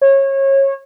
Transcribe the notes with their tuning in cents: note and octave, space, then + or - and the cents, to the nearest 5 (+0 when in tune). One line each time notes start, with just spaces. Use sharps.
C#5 -25